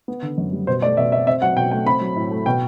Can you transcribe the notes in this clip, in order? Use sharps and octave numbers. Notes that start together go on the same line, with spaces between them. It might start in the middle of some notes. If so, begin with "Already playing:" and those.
B3
D3
F#2
G3
B2 C5
A3 D5
B2 E5
C4 E5
C4 E5
F#3 F#5
B2 G5
A3 G5
C4 B5
F#3
A2
A3
B2 G5